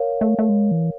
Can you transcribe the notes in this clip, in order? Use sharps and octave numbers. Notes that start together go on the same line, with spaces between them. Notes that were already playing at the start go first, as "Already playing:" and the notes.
Already playing: A#4 C#5 F5
A3
A3
G#3
E3